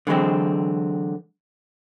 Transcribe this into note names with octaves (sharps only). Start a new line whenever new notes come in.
D3 E3 F#3 G#3 C4